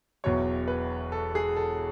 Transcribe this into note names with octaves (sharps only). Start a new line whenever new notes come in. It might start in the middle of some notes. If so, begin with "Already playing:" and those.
E1 E2 B2 F#3 C#5
B4
A4
G#4
A4